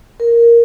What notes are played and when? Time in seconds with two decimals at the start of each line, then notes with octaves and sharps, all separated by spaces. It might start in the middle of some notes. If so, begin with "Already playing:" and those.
0.20 A#4